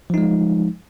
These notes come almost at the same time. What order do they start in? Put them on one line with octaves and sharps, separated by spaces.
F3 D#4 G#3